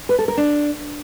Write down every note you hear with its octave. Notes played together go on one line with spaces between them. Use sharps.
B4
A4
A#4
D4